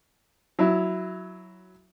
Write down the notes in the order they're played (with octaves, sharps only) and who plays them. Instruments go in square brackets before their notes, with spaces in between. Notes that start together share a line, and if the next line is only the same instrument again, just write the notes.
[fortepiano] F#3 E4